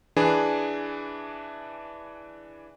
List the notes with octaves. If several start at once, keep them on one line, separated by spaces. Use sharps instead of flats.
E3 D4 G#4 B4